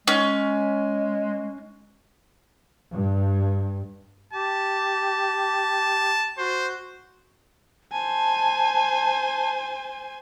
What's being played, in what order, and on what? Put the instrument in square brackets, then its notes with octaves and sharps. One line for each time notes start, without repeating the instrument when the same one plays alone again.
[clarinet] G#3 [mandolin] C#4
[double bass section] G2
[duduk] G4 [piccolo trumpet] A5
[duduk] F#4 [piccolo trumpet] C5
[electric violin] C5 G#5 [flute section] A5